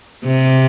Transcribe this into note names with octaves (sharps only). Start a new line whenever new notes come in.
C3